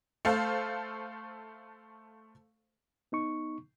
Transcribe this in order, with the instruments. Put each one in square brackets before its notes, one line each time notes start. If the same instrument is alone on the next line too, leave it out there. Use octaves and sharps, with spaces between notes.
[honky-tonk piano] A3 A4 C5 F5
[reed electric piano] B3 D#4 C#6